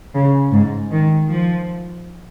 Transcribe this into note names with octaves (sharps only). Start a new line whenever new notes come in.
C#3
G#2
D#3
F3